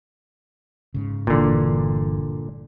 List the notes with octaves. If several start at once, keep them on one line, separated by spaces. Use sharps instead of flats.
G#2 C#3
G1 A#2 D3 E3